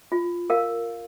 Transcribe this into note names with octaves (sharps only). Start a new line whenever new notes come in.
F4
A#4 F5